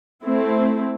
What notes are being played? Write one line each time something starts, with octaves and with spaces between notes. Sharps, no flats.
A3 C4 E4